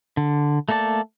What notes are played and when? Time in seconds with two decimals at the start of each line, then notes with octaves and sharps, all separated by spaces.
0.17 D3
0.69 A3 A#3 A4 D5 A5